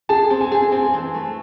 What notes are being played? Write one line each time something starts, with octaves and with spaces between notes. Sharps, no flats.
G#4 A5
C4
G#5
G#4
C4 G#5
E3
A3